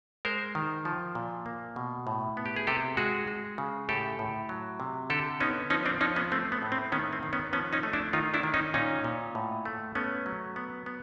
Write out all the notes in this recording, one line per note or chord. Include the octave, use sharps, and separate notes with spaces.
G#3 A#4 C5
D#3
F3
A#2
A#3
B2
A2
B3
G4
G#4
C3 G4 A4
G#3 F#4 G#4
G#3
C#3
A2 G4 A4
A2
F#3
C3
D3 G4 A4
B3 C#4 D#4
F3 C#4 D#4
C4 D4
F3 C#4 D#4
B3 C#4
A3 C4
B3
A2
C4
D#3 B3 C#4
C4
D#3
B3 C#4
F3 B3 C#4
C#4 D#4
A3
D4 E4
D#3 D#4 F4
D4 E4
D#3
C#4 D#4
A#2 C#4 D#4
A#2
A2
A3
A3 B3 C#4
F#3
B3
B3